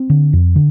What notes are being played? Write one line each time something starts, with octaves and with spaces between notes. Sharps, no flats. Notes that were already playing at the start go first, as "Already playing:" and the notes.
Already playing: C4
D3
F2
D3